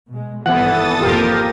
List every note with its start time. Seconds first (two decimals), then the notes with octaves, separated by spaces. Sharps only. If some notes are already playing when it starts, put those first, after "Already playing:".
0.10 B2 G#3
0.46 G#1 G2 E3 B3 A4 F#5 D#6 A6
1.00 G#1 F2 A#3 F4 G4 A#4